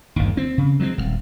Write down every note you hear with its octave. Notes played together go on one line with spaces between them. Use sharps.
G1 D#2
C4
C#3
F#3 G#3 A3 C4
D#1 C#2